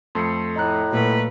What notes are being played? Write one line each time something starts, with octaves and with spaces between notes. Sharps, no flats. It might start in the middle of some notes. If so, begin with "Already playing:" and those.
F2 A3 C6 C7 C#7
A2 D#5 A#5 F#6
A#2 F#3 A3 B4